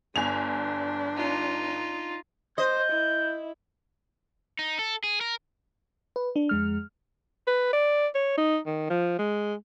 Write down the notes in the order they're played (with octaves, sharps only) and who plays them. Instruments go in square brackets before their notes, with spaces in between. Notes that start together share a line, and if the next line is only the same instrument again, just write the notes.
[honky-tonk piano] G1 G#5 F7 [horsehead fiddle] D4
[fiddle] D#4 F4
[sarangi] C5 [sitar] D#5 [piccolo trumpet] G6
[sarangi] E4
[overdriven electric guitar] D#4
A4
G#4
A#4
[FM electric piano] B4
D4
F2 G#3 F6
[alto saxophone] B4
D5
C#5
D#4
D#3
F3
G#3